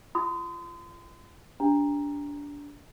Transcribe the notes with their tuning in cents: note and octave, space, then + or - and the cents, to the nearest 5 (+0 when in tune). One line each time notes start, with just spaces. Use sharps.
F4 -25 C6 -35 D#6 +0
D4 -20 G4 +0 A#5 +0